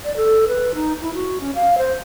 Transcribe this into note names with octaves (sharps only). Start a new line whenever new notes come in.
D5
A4
B4
D#4
E4
F#4
C#4
F5
C5